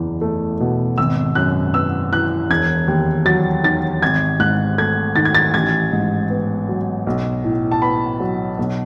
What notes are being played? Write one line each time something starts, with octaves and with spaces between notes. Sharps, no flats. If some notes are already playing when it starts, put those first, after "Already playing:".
Already playing: F#1 E2
A3
B2
G#1 E6
F#2 F#6
B3 E6
E3 F#6
E1 G#6
D#2
F#3 A6
D#3 A6
G#1 G#6
G#2 F#6
A3 G#6
D#3 A6
G#6
A6
A1 G#6
G#2
B3
F#3
B1
A2
A5
B3 B5
F#3
B1